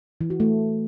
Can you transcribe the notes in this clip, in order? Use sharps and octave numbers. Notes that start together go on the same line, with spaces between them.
E3
F#4
A3